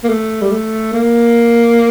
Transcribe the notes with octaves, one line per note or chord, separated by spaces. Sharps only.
A#3
A3
G3
A3
A#3